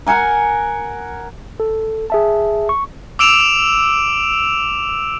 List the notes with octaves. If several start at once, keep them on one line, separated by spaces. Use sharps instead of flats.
A#4 F#5 G#5 A#5
A4
G#4 E5 A5
C#6
D6 E6 D7 E7 F7